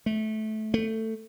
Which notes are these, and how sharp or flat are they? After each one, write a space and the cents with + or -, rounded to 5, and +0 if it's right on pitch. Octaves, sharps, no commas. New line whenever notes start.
A3 -20
A3 +15